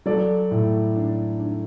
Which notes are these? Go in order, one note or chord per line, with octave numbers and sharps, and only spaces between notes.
F#3 A4 D5
A2
D4
D4